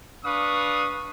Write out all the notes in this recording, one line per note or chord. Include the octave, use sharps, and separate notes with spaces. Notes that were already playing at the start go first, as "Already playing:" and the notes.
D4 B4 F5 C#6 D#6